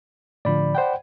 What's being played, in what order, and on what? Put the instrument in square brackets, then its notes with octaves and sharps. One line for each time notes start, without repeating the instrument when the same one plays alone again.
[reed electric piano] A2 D3 F3 [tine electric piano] D5 B5
[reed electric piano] C5 F#5 G5